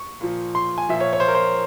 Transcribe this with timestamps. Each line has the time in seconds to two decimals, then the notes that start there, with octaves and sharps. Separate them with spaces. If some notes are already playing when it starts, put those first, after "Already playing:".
Already playing: C#6
0.21 A#2 F3
0.55 C6
0.78 G#5
0.89 A#2 F3 E5
1.00 C#5
1.13 C#5
1.20 C5
1.28 A#4
1.35 C5